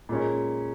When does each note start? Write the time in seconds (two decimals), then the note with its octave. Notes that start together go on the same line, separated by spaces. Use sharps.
0.09 A#2 G#3 C#4